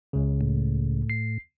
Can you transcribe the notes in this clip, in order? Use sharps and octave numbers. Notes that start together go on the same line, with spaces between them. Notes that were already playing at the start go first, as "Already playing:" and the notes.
C#2 C#3
A2
C7